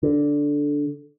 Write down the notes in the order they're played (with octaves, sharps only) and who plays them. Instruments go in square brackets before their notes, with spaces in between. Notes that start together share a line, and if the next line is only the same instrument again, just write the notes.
[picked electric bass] D3